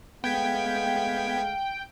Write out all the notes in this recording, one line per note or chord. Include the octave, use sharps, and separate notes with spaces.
G#3 A3 B3 F5 G5 G#6 B6